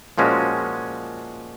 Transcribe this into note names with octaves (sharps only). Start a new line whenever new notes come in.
A#2 F3 G#3 C#4 F#4